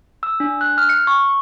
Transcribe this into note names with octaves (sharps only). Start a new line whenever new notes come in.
E6
D4
F#6
F6
C#7
C#6